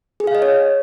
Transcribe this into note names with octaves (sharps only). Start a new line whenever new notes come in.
G#4
F5
D#5
C#5